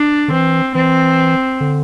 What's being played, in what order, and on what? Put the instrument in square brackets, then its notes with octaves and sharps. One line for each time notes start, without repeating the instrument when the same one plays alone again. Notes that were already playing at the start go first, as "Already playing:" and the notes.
Already playing: [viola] D4
[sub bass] D3
[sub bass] E3 [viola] C4
[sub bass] E3 [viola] C4
[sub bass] D3